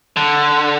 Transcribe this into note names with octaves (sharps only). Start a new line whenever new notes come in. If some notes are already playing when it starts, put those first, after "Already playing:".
D3